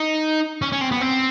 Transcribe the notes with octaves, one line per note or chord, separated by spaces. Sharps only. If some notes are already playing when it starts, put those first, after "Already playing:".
Already playing: D#4
C#4
C#4
C4
B3
C4